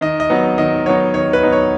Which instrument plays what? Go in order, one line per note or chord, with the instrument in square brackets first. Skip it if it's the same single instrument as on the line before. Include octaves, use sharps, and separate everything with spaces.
[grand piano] D#3 D#5
D#5
F#3 B3 D#4
D#3 D#5
F#3 B3 D#4 C#5
D#3 C#5
B4
F#3 B3 D#4
C#5